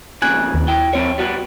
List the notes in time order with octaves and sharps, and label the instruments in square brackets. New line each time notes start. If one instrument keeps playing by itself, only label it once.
[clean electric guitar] F2 A#2 C#3 [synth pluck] G#5 F#6 G#6
[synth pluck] D#2
[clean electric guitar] E4 G5
F3 C4 C#5
G3 B3 F#4